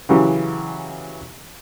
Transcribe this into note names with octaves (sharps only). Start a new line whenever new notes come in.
C#3 E3 F#3 G4